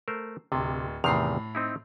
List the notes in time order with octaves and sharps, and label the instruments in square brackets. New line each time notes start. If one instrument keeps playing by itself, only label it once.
[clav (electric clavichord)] A3 A#4 C5
[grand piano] D1 [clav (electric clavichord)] C3
[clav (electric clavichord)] E2 C3 D#3 [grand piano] A2 C7 F7
[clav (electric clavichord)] C4 D#4 E4